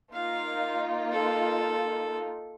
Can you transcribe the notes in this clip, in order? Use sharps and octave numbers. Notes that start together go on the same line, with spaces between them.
A#3 D#4 F4 F5
A4